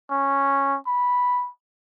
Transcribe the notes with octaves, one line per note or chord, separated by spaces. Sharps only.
C#4
B5